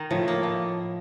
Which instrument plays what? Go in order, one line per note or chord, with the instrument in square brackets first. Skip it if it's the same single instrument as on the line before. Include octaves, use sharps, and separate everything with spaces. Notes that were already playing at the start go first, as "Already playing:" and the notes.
Already playing: [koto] D#3 D#4
[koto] A2 [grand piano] F3
[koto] A#3
A2